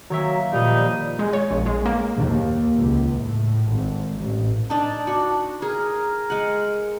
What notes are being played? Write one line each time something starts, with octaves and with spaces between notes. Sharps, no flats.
D#3 F#3 A#3 C#5 E5
A#2 F3 G3 D#4
G#3
C#5
A#1
G#3
A#3
D#2
C#2
A2
G#1
A1
D4 D#4 A5
D4 F#4
G#4 A#4
G#3 F#5